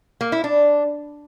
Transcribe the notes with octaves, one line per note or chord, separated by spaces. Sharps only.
A#3
E4
D4